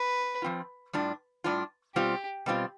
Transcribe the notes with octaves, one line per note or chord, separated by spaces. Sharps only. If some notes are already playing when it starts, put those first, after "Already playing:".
Already playing: B4
F3 C4 F4
A2 G3 D4 F4
A2 G3 D4 F4
B2 G3 C4 F4 G4
B2 G3 C4 F4